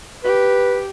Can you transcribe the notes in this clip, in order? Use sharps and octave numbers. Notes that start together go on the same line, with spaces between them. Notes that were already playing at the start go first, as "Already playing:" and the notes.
G4 B4